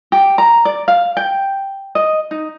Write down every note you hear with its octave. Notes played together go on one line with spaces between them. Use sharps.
G4
A#5
D5
F5
G5
D#5
D#4